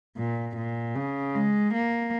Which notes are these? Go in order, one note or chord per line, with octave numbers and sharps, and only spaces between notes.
A#2
A#2
C#3
G#3
A#3